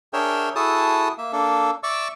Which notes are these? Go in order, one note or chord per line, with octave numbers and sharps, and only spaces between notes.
D4 G#4 A#4 C#5 E5 G5
E4 F#4 G#4 A4 A5 D#6
A#3 E5
A#3 D4 A4
D5 E5 C#6 D6 E6